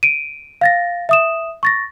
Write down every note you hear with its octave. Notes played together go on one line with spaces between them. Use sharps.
D7 D#7
F5 A6 A#6
E5 D#6 E7
C#6 A6 A#6